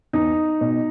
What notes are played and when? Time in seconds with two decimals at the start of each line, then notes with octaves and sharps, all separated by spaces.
0.13 E2 D#4
0.61 B2